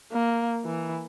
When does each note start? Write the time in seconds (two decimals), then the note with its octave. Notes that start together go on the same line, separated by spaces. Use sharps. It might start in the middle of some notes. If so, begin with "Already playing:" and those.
0.12 A#3
0.65 E3